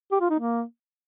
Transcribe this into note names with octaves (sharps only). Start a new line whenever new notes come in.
G4
F4
D#4
A#3